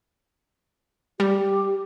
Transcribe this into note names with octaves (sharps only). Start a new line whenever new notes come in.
G3 G4